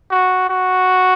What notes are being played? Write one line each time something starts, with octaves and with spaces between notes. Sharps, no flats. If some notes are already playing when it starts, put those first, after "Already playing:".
F#4
F#4